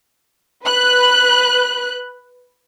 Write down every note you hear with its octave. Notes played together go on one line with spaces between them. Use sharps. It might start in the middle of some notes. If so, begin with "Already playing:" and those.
B4 F#6